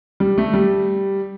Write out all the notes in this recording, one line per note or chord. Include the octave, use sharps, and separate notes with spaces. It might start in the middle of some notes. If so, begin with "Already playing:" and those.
G3
A3
G3